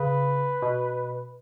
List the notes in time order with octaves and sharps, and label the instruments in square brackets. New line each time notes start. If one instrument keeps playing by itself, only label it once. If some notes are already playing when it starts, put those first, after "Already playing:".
Already playing: [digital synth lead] C#3 [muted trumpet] B4
[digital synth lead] B2